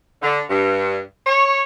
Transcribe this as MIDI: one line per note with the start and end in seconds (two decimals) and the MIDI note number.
0.22 0.39 50
0.49 0.99 43
1.27 1.62 73